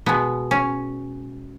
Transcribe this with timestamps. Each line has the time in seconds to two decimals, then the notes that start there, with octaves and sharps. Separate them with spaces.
0.06 B2 G#3 B3
0.51 C#4